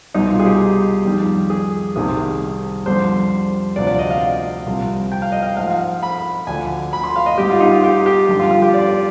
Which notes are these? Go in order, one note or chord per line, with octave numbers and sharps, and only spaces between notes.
C2 B2 G3 D#4
F4
G#4
G4
F2 D#3 G3
G#4
C2 C3 D#3 G3 G#4
F2 D3 G3 C5
D2 C3 F3 D5
D5
D#5
F5
C2 C3 F3
G5
F5
D#5
F5
G#2 F3 F5
B5
D2 D3 F3 G#5
B5
C6
F5
D#5
G#2 G3 G4
F4
D#4
F4
G4
G4
G2 D3 F3
F4
F4
G4
D5
D5